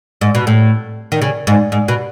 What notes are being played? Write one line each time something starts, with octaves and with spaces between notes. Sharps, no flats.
G#2
B2
A2
D#3
C#3
G#2
G#2
B2